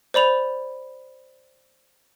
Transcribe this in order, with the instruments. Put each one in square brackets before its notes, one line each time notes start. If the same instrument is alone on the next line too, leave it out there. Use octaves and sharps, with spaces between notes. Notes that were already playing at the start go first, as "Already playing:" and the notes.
[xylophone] C5 D5 B5 F7